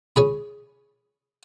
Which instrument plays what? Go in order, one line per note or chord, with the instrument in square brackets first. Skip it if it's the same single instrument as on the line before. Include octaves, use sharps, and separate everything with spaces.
[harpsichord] C#4 G#4 B5